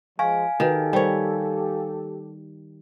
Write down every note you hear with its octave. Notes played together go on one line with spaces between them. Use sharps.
F3 G#3 F5 G#5 C#6
D#3 F#4 G4 A4 B4
G3 A#4 C5 C#5 G5